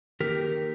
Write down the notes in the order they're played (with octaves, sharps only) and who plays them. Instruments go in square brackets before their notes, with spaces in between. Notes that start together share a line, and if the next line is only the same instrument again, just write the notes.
[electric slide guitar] D#3 A#3 D#4 G4 A#4